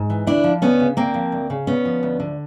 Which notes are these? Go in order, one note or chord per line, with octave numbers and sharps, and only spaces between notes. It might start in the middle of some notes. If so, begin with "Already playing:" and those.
Already playing: G#2
E3
D2 D4 E4
F3
D2 B3 C#4
C#3
D2 A#3 C4
F3
D2
C#3
D2 B3 C#4
F3
D2
D3